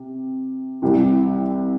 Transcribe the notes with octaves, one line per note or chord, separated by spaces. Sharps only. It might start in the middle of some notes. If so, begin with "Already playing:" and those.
Already playing: C3
C2 C3 E3